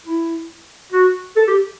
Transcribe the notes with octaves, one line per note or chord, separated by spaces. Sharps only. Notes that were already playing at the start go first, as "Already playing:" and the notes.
E4
F#4
A4
G4